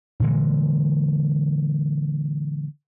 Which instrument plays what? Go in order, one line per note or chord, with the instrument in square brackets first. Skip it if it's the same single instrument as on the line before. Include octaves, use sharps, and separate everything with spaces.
[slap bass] A#2 D3 E3 G#3